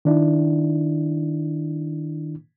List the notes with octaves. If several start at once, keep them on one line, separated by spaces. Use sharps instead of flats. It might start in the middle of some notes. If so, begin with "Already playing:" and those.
D#3 D4 E4